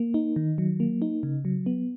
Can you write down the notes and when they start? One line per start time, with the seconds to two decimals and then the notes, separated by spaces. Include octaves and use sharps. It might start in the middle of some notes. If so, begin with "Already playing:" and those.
Already playing: A#3
0.14 D#4
0.36 D#3
0.58 F#3
0.80 A#3
1.02 D#4
1.23 C#3
1.45 F#3
1.66 B3